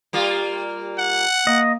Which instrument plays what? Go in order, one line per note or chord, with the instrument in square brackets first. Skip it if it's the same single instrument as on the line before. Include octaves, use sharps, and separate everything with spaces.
[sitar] G3 A#3 F4
[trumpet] F#5
[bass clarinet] A#3 [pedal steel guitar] D#5